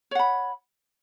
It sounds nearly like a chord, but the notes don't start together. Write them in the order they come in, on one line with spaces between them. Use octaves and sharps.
C#5 F#5 B5